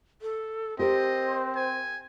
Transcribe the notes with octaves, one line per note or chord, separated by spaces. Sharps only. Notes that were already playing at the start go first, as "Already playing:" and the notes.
A4
C4 G4 A#4 C5 D#5
G#5